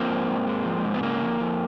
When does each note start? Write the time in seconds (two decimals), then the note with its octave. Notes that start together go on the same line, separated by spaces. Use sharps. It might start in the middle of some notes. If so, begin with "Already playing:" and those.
Already playing: F3 A#3 C4
0.09 G#2
0.28 G#2
0.47 G#3
0.65 F3
0.85 G#2
0.94 B3
1.03 C#3 A#3
1.22 F2
1.40 F2